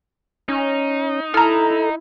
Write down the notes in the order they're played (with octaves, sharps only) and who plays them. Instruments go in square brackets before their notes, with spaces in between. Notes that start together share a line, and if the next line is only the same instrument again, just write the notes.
[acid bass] C#4 [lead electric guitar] D#4
[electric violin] E4 [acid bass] A4 [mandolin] A#5 F6